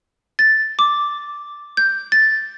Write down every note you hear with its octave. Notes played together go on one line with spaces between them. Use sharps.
A6
D6
G6
A6